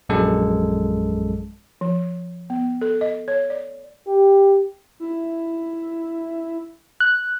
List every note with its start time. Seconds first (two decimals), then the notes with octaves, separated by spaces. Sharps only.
0.09 A#1 F#2 G#3 A4
1.81 F3
2.50 B3
2.81 A4
3.01 D#5
3.28 C#5
3.50 D5
4.08 G4
5.00 E4
7.00 F#6